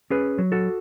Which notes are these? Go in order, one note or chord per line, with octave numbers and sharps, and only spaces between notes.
C#4 G#4 B4
F#3
F#4 A4